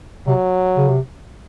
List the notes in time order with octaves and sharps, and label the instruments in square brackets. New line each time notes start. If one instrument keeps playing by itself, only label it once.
[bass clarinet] C3 [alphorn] F#3
[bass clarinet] C#3
C3